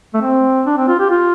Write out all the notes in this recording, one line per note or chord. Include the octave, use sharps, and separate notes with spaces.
A3
C4
D4
C4
F4
G4
F4